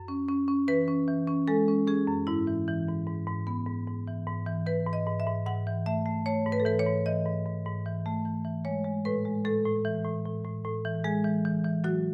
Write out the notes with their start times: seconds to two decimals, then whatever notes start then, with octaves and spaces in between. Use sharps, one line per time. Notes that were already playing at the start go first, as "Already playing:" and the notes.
Already playing: F#2
0.08 C#4
0.28 C#4
0.48 C#4
0.68 E3 B4
0.88 C#4
1.08 E3
1.27 C#4
1.48 G#3 A4
1.68 C#4
1.87 C#4 G#4
2.08 F#2
2.27 G#2 E4
2.47 E3
2.68 E3
2.88 G#2
3.07 G#2
3.27 G#2
3.47 B3
3.67 G#2
3.87 G#2
4.07 E3
4.27 G#2
4.46 E3
4.66 E3 B4
4.86 G#2
4.93 D#5
5.06 G#2
5.20 E5
5.27 G#2
5.46 G#2 F#5
5.67 E3
5.86 A3 E5
6.06 A3
6.26 A3 C#5
6.46 G#2
6.52 B4
6.60 A4
6.65 E3 B4
6.79 C#5
6.86 G#2
7.06 E3 D#5
7.26 G#2
7.46 G#2
7.66 G#2
7.86 E3
8.06 A3
8.25 E3
8.45 E3
8.65 G#3 C#5
8.85 G#3
9.05 A2 B4
9.25 G#3
9.45 A2 A4
9.65 A2
9.85 E3
10.04 A2
10.25 A2
10.45 A2
10.65 A2
10.85 E3
11.04 G#3 G#4
11.24 E3
11.45 E3
11.65 E3
11.84 F#3 F#4